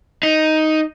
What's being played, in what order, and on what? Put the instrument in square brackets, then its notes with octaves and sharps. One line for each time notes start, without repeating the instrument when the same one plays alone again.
[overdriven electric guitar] D#4